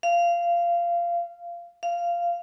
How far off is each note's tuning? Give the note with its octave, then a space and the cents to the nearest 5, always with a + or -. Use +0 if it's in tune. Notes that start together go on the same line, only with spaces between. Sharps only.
F5 -20
F5 -15